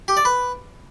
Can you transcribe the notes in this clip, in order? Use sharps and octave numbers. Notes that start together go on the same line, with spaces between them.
G4
D5
B4